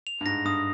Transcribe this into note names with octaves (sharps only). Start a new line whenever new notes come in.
F7
G2
G#2 A#6
G2 D#6